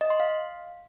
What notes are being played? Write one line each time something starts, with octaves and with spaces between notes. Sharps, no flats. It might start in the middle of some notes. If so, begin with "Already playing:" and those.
D#5
C6
F5